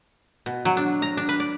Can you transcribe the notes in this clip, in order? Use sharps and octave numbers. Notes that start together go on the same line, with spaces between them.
B2
F#3
D4
A#5
D4
B4
D5